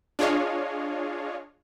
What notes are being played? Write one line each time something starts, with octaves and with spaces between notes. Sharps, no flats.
D4 F4 G#4 C#5 D#5 F5